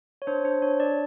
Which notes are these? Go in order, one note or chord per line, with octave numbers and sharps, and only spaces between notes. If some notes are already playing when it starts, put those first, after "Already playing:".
C#5
D4 C5
D4 C5
D4 C#5
D4 D5